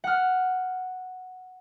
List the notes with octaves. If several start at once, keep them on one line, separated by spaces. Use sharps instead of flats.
F#5 F6